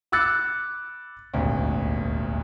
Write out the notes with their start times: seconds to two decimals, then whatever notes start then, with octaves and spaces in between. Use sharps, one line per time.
0.12 B5 D6 E6 F#6 A6 C#7
1.34 D#1 G#1 D2